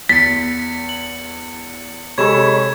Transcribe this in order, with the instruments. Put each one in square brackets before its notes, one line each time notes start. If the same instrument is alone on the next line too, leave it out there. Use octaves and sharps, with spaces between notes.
[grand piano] E2 [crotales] A6 C#7 [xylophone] B6
[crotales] F#7
[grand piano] C3 G#3 A4 [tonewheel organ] C#5 B5 C#6 [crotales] G#6 E7